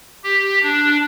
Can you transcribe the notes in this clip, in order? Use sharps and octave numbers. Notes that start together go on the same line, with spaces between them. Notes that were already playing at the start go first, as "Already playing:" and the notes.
G4
D4